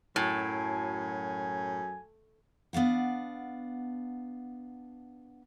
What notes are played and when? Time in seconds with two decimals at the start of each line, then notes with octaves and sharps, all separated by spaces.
0.16 F#2 A2 F#3 G#5
2.73 B3 D4 F5 F#5